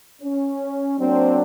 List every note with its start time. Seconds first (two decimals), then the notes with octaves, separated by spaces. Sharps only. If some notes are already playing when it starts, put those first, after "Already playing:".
0.22 C#4
0.99 F#3 A#3 C4 D4